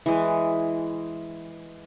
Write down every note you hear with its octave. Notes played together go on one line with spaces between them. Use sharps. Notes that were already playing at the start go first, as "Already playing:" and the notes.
E3 G#3